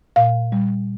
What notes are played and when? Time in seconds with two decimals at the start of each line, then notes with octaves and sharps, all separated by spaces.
0.16 A#2 F5
0.52 G3